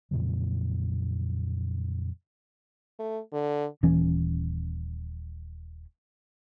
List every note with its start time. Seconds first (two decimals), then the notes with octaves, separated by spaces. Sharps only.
0.11 F2 A#2 C#3 F#3
2.99 A3
3.33 D3
3.83 D#1 E3 C#4